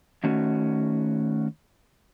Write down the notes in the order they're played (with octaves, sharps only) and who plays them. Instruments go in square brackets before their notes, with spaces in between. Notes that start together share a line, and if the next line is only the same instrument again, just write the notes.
[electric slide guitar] D#3 A3 C#4 F#4